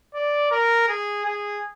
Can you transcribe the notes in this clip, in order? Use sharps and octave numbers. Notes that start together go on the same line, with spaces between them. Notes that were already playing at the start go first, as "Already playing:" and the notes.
D5
A#4
G#4
G#4